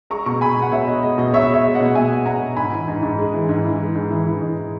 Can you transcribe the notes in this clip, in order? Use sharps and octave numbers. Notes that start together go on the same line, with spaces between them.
G#3 A#5 C#6
B2 A#5 C#6
G#3 G#5 B5
B2
F#5
B2 C#5 E5
G#3 D#5
G#3 D#5
B2 D#5
B2 C#5 E5
G#3 C#5 E5
G#3
D#5 F#5
B2
B2 E5 G#5
G#3
B2 F#5 A#5
G#3
G#2 G#5 B5
E3
G#2
G#2
G#3
E3
G#2
E3
G#3
G#2
E3
E3
G#2